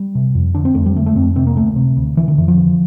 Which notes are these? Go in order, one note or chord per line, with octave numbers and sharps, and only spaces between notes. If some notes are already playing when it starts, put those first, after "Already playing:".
Already playing: G3
C3
F2
D3 D4
C4
F2 A3
G3
D3 A3
A3
F2 C4
C3 C4
A#3
D2 A3
C3
D2
D3 E3
D3
F2 E3
F3
D3